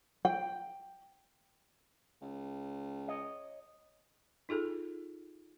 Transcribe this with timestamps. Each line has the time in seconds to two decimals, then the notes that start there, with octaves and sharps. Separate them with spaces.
0.25 G5
2.22 C#2
3.08 C#5 D#5
4.49 D#4 F4 G#4 A4